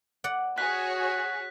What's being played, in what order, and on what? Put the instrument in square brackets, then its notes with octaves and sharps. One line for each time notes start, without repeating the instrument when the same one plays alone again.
[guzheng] D5 F#5
[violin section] F#4 G#4 C#5 [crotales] F#6 B6